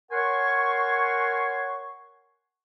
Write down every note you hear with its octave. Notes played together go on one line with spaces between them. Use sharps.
A#4 C#5 F#5 G#5 C6 C#6